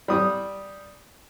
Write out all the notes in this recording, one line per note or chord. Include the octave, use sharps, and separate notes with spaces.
G3 D#6